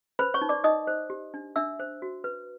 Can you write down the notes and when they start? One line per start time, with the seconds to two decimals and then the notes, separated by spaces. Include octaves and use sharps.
0.19 B4 C5 B5
0.34 C#5 C#6
0.41 D#4
0.49 D5 D6
0.64 D#4 D#5 D#6
0.87 C5
1.10 G4
1.34 D4
1.56 D4 E5 E6
1.80 C5
2.02 F#4
2.24 B4